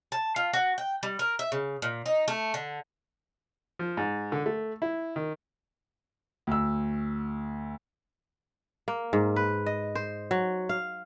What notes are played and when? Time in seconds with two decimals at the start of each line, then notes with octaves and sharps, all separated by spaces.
0.12 A5
0.36 F4
0.53 F#4
0.78 G5
1.03 G3
1.19 A#4
1.39 E5
1.52 C#3
1.82 A#2
2.06 D#4
2.28 A3
2.54 D3
3.79 F3
3.97 G#2
4.32 D3
4.46 A3
4.82 E4
5.16 D#3
6.47 D2 E6
8.88 A#3
9.13 G#2
9.36 B4
9.66 D#5
9.95 C5
10.31 F#3
10.69 F5